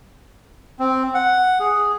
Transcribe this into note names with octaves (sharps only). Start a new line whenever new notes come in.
C4
F#5
G#4